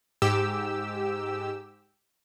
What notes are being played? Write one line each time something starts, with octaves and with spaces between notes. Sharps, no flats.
G#2 G4 E6